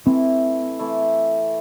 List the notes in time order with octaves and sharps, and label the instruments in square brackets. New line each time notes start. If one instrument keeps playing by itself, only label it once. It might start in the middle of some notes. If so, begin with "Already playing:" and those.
[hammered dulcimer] E3 A3 E4 [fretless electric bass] C4
[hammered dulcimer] E3 A3 E4